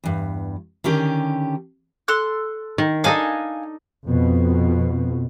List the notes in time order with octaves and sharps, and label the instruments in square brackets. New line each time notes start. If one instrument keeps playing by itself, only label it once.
[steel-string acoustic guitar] E2 G2
D3 D#3 C#4 G4
[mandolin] A4 C6 F#6
[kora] D#3
[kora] D4 D#4 A4 [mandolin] F5 G#5
[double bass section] F2 B2